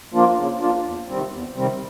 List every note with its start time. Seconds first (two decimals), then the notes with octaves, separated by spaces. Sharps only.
0.13 F3 A#3 D4 F4
0.37 C#3
0.60 F3 A#3 D4 F4
0.85 E2
1.08 C3 D#3 G3 C4
1.32 E2
1.56 C3 D#3 G3 C4